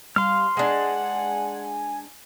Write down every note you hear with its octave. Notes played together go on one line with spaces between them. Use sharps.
G3 F5 C6 F6
G#3 D4 F#5 G#5